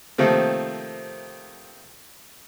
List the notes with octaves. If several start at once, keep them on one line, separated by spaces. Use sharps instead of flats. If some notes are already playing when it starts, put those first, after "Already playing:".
C3 D#3 F3 A3 A#3 C4